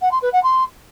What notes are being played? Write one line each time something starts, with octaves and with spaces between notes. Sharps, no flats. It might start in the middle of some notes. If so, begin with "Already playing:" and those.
F#5
C6
B4
F#5
C6